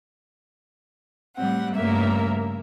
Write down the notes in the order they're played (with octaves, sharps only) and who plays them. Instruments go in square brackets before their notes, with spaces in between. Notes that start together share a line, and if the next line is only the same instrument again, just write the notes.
[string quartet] A2 G3 C4 F#5
G2 C#3 A3 A#3 A#4 E5